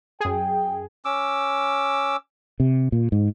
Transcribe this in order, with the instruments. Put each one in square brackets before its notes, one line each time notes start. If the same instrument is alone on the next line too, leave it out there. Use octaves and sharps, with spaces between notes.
[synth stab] F#2 G#4 [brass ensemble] G5
[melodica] C#4 D6 E6
[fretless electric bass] C3
A#2
G#2